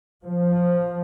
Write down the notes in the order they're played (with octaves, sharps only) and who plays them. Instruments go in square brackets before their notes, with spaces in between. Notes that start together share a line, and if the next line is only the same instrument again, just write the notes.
[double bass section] F3